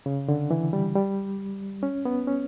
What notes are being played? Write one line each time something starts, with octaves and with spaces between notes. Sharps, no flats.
C#3
D3
E3
G3
G3
C#4
B3
C#4